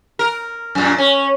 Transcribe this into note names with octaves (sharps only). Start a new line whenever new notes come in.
A#4
F#2 A#2
C#4